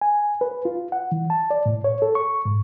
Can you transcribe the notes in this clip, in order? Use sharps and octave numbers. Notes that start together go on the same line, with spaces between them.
G#5
B4
F4
F#5
E3
A5
D5
A2
C#5
A4
C#6
G#2